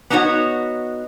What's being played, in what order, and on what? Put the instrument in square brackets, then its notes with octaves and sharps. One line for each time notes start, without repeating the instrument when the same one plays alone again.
[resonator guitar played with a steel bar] B3 D4 D#4 F4 F#4 C#5